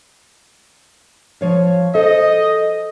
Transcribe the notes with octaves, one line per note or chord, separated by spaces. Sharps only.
F3 C#5 F5
A4 C5 D#5